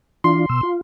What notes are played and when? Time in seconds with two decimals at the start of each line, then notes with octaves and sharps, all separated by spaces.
0.24 E3 D4 F4 C6
0.49 B2 E6
0.63 F4